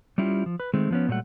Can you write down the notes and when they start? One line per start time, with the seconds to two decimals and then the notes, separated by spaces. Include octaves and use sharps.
0.18 G3 C#4 E4 F4 G4
0.46 F3
0.60 B4
0.74 D#3 G#3 A3 C4
0.91 F3 B3 C#4
1.08 A#2 F#3 G3 A3 F#5